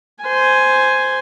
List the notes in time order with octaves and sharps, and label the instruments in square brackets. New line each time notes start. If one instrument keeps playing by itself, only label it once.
[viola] C5 G#5